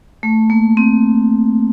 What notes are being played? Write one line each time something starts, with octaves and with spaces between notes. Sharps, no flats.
A3
A#3
C4